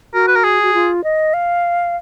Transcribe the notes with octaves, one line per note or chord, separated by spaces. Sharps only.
F#4 A#4
B4
A#4
G#4
F#4
F4
D#5
F5